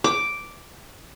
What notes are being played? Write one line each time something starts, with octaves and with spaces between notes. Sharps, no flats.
D6